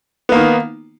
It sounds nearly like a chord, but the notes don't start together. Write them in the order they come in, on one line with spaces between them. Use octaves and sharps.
B3 A#3 D#3